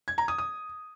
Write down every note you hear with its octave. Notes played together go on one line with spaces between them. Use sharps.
G#6
A#5
D#6
D#6